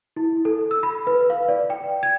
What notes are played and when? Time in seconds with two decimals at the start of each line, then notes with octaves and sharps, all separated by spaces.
0.16 E4
0.45 A4
0.71 E6
0.83 B5
1.07 B4
1.30 F5
1.48 D5
1.70 G5
2.03 G#6